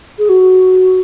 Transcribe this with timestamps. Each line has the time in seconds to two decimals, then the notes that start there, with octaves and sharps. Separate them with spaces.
0.19 G#4
0.29 F#4